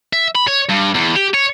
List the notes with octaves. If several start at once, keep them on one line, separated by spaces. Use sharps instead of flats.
E5
B5
C#5
G2
E2
G4
C#5